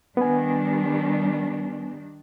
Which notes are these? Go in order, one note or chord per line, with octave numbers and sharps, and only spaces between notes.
D#3 G3 B3 D4 G#5